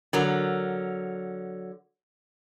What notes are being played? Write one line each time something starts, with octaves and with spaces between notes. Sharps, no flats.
D3 F#3 A#4